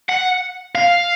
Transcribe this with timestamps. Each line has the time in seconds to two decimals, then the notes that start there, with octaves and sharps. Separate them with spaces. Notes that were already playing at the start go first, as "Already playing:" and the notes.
0.09 F#5
0.75 F5